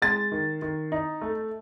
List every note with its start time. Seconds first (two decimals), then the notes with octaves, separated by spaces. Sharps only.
0.02 G#3 A6
0.32 D#3
0.62 D#3
0.92 D#4
1.21 A3